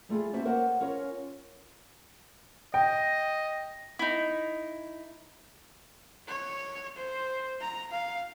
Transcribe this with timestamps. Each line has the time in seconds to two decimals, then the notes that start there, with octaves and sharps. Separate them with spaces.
0.09 G3 A3 F4 G#4
0.33 A#3 C#4 F#4 C5 E5 A5
0.45 A#3 A#4 C5 C#5 F#5 A5
0.81 C#4 F4 A#4 C#5
2.74 D#5 G5
3.99 D#4 E4
6.28 C#5
6.97 C5
7.61 A#5
7.91 F5